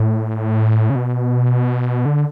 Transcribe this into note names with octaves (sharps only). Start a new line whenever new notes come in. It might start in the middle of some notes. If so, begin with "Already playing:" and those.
Already playing: A2
C#3
B2
D3